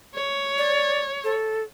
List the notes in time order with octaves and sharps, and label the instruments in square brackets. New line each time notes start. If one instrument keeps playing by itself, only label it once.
[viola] C#5
[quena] D5
A4